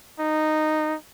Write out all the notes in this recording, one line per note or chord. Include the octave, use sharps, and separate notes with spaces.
D#4